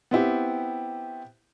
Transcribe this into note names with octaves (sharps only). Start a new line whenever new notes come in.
B3 C4 E4 G4